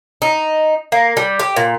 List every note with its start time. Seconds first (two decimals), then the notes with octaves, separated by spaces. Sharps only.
0.22 D#4
0.92 A#3
1.17 G3
1.40 G4
1.56 A#2